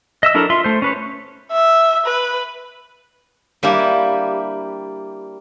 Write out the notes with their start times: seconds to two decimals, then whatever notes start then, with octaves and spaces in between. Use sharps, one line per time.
0.23 D#5 E5 E6
0.34 F#3 D4 E4 A4 A#4
0.50 F4 E5 C6
0.64 A3 C5
0.82 C#4 B4 C#5
1.52 E5
2.06 B4
3.63 G3 A#3 D4 E4 G4